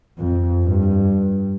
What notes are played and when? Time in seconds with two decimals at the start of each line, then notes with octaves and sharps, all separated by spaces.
0.18 F2
0.63 G2